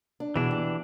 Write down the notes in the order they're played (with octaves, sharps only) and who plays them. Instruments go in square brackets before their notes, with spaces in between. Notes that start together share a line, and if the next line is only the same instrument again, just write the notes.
[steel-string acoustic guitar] D4
[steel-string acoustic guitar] B2 G#4 [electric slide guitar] E3 D4
[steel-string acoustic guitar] G4